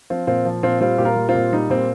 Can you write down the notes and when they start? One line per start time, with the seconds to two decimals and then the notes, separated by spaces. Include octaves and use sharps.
0.10 F3 C4 F4
0.27 A#2 C4 F4
0.45 F3
0.63 A#2 C4 F4
0.81 G3 C4 F4
0.98 A#2 G4
1.05 F4 A#4
1.16 G3
1.29 C4 F4
1.35 A#2
1.53 G3 D#4
1.70 A#2 C4